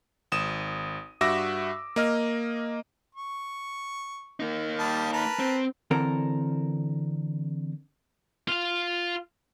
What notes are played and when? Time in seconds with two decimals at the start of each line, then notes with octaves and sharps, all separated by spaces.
0.32 G#1 D#6 E7
1.21 G2 F#4 E5 D6 E6 A#6
1.96 A#3 D#5 F6
3.15 C#6
4.40 A#3 D#4
4.79 G3 A5 D#6
5.13 A#4 B4 A5
5.39 C4
5.91 D3 E3 C4 A4 A#4
8.48 F4 F5